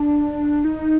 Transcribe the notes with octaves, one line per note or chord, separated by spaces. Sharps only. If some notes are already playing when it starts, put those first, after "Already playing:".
Already playing: D4
D#4